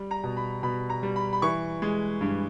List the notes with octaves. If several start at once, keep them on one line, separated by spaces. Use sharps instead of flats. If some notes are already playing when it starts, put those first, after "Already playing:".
Already playing: G3
A#5
B2
B5
B2 B5
A#5
G3
B5
B5
E3 C#6
G#3
G2